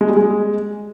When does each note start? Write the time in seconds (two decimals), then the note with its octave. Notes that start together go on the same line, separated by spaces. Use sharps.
0.01 G#3
0.09 G3
0.17 G#3